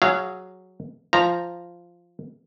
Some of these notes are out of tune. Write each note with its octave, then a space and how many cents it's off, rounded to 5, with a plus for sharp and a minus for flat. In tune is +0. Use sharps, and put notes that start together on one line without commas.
F#3 +0 G#4 +0 F5 -25
F3 -5 A#5 -5